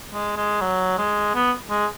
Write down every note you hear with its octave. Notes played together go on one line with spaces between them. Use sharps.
G#3
G#3
F#3
G#3
B3
G#3